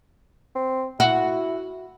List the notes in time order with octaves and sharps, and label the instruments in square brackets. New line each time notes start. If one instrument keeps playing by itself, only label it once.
[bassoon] C4
[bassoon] E4 [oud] F#4